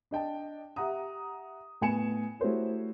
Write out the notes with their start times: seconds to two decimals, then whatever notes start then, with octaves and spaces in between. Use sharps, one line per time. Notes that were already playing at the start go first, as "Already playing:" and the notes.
0.11 D4 D#5 G5 A5
0.76 G4 E5 F#5 A#5 D#6
1.81 A2 B3 G#5 C#7 E7
2.40 A3 E4 F#4 G4 C5 C#5